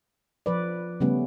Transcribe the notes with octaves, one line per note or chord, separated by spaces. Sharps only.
F3 B4 D5
C#3 G3 A3 B3 C#4